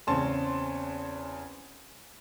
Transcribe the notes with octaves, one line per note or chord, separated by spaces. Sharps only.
E2 C#3 C4 C#4 A5 C6